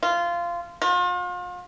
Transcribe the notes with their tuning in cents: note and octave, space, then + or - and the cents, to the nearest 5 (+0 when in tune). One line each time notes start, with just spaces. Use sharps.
F4 -15
F4 +40